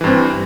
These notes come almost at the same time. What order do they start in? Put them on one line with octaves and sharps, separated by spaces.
E3 G2 C4